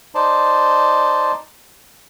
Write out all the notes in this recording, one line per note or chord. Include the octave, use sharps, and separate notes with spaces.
D#4 C5 D5 A5